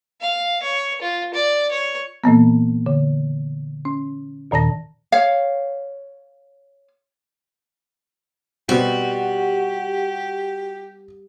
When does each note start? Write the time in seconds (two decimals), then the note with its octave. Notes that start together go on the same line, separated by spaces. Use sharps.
0.21 F5
0.63 C#5
1.02 F4
1.34 D5
1.71 C#5
2.24 A#2 E3 A#3 B3
2.86 D3
3.85 C#4
4.51 D#2 A#2 D#3 A5 A#6
5.12 C#5 F5
8.69 B2 G3 C4 F#4 G4 E5